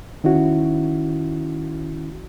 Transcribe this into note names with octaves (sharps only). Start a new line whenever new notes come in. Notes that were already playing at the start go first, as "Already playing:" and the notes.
D#3 C#4 E4 F#4